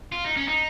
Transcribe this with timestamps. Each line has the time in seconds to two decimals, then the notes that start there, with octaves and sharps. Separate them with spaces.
0.12 F4
0.24 D#4
0.36 C#4
0.48 D#4